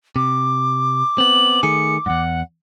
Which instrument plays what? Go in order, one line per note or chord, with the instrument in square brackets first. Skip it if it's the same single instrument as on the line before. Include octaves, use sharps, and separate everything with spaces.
[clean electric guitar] C3 [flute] D6
[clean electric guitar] B3 C4 [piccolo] F#7
[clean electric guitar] D#3 A3 G#4 [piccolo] C#7
[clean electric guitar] E2 G2 [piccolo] F#5